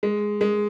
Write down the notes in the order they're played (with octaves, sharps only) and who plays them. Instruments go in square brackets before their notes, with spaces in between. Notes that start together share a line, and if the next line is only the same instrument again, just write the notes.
[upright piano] G#3
G#3